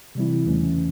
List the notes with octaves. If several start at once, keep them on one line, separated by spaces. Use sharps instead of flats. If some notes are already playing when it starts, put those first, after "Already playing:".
C3 E3 G3 C4 E4
E2 C#3 E3 A3 C#4